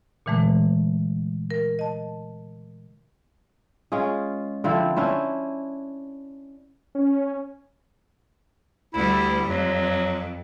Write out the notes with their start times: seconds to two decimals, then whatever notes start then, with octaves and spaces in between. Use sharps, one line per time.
0.26 A#2 D3 E3 G#3 A3
1.51 A#4
1.79 D#5 A5
3.92 G#3 C#4 F4 G#4
4.64 D3 F3 C4 E4
4.96 C#4 D4 E4 C5
6.95 C#4
8.94 D2 G3 E4
9.47 F2 F#3